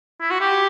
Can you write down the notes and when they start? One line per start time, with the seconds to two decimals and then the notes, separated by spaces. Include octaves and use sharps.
0.21 E4
0.30 F#4
0.41 G4